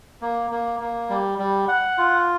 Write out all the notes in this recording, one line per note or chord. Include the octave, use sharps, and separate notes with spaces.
A#3
A#3
A#3
G3
G3
F#5
F4